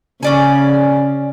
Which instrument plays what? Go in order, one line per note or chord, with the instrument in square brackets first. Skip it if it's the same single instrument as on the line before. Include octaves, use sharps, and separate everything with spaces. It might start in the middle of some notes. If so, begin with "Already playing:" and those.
[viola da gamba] C#3 [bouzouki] C#4 D5 G#5